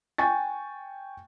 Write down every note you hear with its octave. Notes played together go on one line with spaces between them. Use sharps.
G5 G#5 C#6 A6